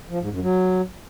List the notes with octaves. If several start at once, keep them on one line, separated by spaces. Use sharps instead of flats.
F3
G#2
F#2
F#3